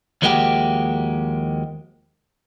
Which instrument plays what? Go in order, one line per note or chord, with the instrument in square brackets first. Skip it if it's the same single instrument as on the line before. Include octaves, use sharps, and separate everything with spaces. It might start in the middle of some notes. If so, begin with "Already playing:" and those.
[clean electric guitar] D#2 F3 G#3 A#3 F#4 G4